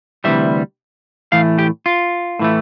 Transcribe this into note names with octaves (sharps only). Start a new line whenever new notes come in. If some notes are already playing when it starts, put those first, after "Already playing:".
D2 C3 E3 G3 E5
A2 E3 A3 F5
G4
F4
A2 E3 A3